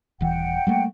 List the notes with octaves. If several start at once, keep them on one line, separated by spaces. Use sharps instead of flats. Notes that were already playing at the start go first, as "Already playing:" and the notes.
D#1 E3 F#5 G5
G3 A3 A#3